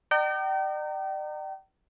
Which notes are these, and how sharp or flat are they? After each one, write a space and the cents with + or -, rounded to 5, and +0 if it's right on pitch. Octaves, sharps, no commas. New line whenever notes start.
D5 +45 G5 -35 A#5 -30